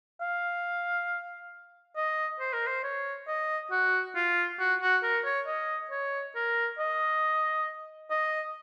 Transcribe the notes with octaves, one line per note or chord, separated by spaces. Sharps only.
F5
D#5
C5
A#4
C5
C#5
D#5
F#4
F4
F#4
F#4
A#4
C#5
D#5
C#5
A#4
D#5
D#5